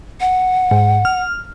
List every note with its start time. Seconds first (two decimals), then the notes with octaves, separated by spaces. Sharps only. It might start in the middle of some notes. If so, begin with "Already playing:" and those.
0.20 F#5
0.71 G#2
1.05 F6